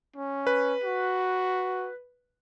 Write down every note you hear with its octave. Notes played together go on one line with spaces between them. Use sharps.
C#4
B4
F#4